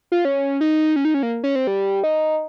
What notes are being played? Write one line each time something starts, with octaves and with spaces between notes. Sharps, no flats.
F4
C#4
D#4
C#4
D#4
C#4
A#3
C#4
C4
G3
D#4